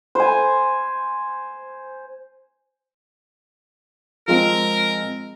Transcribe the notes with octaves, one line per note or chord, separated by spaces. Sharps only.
C5 G#5
F3 G#3 C4 A#4